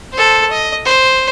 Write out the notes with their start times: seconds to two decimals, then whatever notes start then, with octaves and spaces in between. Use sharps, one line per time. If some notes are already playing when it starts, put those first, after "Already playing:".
0.13 A4 C5
0.51 D#5
0.85 C5